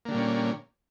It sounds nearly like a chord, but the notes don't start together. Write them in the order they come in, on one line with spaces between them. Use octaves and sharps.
A#3 D3 G3 A#2 C#4